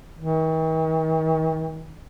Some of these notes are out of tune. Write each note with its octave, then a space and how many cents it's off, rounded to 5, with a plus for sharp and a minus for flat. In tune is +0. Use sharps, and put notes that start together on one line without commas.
D#3 +45